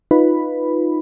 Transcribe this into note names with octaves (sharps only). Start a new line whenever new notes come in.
D#4 F4 B4 B5